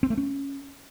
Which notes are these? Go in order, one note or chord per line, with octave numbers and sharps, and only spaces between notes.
C4
A3
C#4